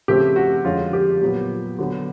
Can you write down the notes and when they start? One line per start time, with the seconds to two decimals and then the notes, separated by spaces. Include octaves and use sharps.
0.08 C#3 F3 A3 C4 G4
0.36 F#4
0.65 F2 D3 F3 G#3 C#4 F4
0.93 G4
1.21 A#2 F#3 B3
1.79 D3 F#3 B3